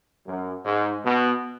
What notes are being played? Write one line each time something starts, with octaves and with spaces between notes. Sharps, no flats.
F#2
G#2
B2